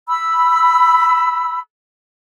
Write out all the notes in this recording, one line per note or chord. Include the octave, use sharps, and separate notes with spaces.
B5 E6